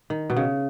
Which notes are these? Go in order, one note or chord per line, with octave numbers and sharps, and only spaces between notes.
D#3
B2
C#3